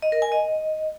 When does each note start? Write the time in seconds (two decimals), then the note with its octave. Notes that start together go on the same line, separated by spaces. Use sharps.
0.02 D#5
0.12 A#4
0.22 G#5
0.32 D#5